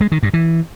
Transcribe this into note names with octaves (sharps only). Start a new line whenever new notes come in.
G#3
D#3
G2
E3